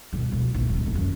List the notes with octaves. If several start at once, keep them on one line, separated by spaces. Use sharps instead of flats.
G2 B2
B2 F3
A#1 E3
D#1 F#3
F2 C#4
F#2